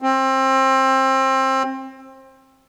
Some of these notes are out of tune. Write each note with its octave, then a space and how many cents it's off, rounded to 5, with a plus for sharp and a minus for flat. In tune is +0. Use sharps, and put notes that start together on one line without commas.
C4 +25